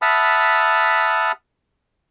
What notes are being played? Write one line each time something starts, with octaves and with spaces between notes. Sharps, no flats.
E5 F#5 A5 B5 D#6 F6